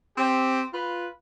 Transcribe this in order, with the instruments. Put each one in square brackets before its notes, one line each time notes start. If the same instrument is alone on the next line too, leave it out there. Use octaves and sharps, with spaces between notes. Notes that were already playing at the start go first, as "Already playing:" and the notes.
[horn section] C4 G4
F4 B4